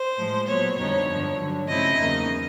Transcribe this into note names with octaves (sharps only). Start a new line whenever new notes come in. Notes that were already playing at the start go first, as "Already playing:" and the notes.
Already playing: C5
A2 F3 G#3
A#2 F#3 B3 C#5
F2 D3 G3 B3 D#4 C#5
G2 D3 F3
G2 D3 F#3
C#3 F3 A3 C4 E4 D#5
E2 C#3 F#3 A#3 D#4